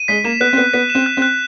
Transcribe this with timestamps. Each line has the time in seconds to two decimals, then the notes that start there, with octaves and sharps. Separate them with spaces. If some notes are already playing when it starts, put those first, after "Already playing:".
Already playing: D#7
0.08 G#3 B6
0.24 A#3 E7
0.41 B3 F#6
0.53 C4
0.57 B3 F#6
0.74 B3 B6
0.90 E7
0.95 C4
1.06 F#6
1.17 C4
1.22 F#6